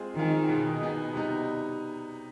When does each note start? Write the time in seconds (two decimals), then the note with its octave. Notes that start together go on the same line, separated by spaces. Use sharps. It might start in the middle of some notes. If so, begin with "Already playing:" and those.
Already playing: G#3 C4 F4 G#4
0.17 D#3 G#3 C4 F4 G#4
0.49 B2 B3 D#4 G#4
0.81 B2 B3 D#4 G#4
1.13 C3 G3 B3 D#4